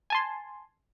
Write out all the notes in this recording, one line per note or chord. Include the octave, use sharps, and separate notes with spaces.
G#5 A5 C6